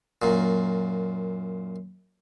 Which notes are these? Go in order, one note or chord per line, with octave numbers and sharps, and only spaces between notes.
F#2 A#2